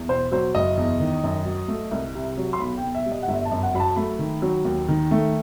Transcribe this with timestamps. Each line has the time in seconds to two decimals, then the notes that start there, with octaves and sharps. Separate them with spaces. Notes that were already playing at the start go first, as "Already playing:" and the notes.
Already playing: E2
0.09 B2 C5
0.32 F#3 C5
0.55 F#1 D#5
0.77 E2
1.00 D#3
1.24 F#2
1.45 F#3
1.68 A3
1.91 C2
2.15 C3
2.37 F#3
2.53 C6
2.59 B1 B5
2.77 G5
2.83 B2
2.95 E5
3.06 G3
3.12 D#5
3.23 F#5
3.28 G1 E5
3.45 A5
3.51 F#2
3.63 F#5
3.74 F#3 B5
3.80 A5
3.96 A3 B5
4.19 D#3
4.42 F#3
4.65 D#2
4.88 D#3
5.11 A3